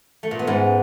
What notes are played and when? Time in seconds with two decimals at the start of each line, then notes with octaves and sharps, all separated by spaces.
0.23 A3
0.31 A#2
0.39 B3
0.47 G#2